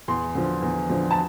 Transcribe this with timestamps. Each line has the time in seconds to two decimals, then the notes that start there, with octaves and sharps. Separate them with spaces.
0.08 E2 C6
0.35 D3 F3
0.62 E2
0.89 D3 F3
1.11 A5